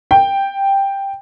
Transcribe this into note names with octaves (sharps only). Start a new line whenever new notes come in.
G5